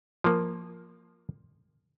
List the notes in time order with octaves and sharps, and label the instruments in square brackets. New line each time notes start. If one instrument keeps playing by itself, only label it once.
[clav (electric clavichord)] F3 A#3